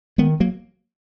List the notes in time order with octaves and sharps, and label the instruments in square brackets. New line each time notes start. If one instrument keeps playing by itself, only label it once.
[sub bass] D#3 [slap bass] G#3 B3
[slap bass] F#3 A#3